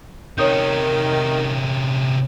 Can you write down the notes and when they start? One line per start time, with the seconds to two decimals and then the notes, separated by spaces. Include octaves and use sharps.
0.38 C3 D#3 C#4 C#5 D#6 G6